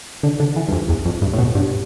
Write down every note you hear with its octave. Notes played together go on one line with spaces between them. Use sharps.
D3
D3
E3
G2
F2
E2
F2
G2
A2
B2
G2